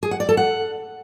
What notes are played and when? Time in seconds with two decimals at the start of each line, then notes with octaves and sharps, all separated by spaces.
0.03 G#4
0.11 F#5
0.20 D5
0.29 A4
0.37 F#5